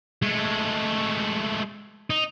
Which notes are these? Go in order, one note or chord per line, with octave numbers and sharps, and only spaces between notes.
G#3 A3
D#4